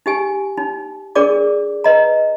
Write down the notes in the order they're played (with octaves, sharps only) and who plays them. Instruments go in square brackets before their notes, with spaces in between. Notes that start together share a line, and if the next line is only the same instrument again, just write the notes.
[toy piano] D#4 G4 G#5
D#4
D4 G#4 A#4 D5 D6
B4 D#5 A#5